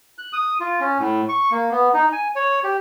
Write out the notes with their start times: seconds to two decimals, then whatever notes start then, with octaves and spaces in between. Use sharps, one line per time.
0.18 F#6
0.33 D#6
0.60 F4
0.80 C#4
0.99 A2
1.29 C#6
1.51 A#3
1.71 B3
1.94 D#4
2.12 G#5
2.35 C#5
2.64 G4